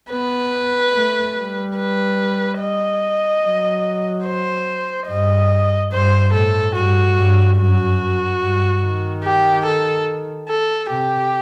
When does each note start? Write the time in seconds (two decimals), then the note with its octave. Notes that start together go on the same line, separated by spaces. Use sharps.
0.10 B3 B4
0.94 A3
1.35 G3
1.76 B4
2.60 D#5
3.43 F#3
4.25 C5
5.08 G2 D#5
5.92 G2 C5
6.33 A2 A4
6.75 G2 F#4
7.16 G2
7.58 F#2 F#4
8.41 G2
8.82 D#3
9.23 G4
9.65 A4
10.49 A4
10.90 C3 G4